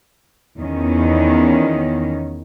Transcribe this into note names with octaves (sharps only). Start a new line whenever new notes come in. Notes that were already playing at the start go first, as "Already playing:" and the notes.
E2 D#3 C#4